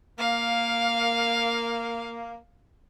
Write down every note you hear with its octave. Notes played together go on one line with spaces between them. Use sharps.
A#3 F5